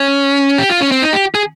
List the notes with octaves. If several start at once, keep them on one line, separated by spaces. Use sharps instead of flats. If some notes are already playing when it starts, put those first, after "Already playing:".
Already playing: C#4
G4
F4
C#4
C4
D#4
G4
G#4